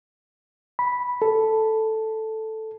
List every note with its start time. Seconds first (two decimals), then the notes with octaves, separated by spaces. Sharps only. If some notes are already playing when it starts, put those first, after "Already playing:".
0.79 B5
1.22 A4